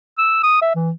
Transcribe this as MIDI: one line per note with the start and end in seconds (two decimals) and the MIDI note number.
0.18 0.38 88
0.43 0.61 87
0.62 0.73 76
0.75 0.91 52